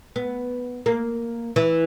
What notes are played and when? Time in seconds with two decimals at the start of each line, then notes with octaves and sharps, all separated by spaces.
0.16 B3
0.86 A#3
1.56 E3